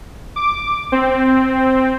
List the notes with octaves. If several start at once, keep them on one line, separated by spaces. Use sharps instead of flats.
D6
C4